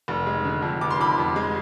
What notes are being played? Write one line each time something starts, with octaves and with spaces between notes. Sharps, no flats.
F1
G#3
D3
F2
F1 D6
C6
F2 B5 D6
F2
G#3